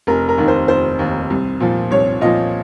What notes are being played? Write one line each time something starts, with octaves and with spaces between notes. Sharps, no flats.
F1 A#4
A#4
D#2 D#3
C5
F1 C5
D#2 D#3
C2
A#2 F3
C2 C#5
A#2 F3 D#5